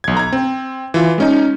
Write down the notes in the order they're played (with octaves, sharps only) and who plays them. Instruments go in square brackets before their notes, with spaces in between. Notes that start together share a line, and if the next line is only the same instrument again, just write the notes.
[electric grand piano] B1 G#6
A#5 G#6
C4
E3 F4
G#3 C#4 D#4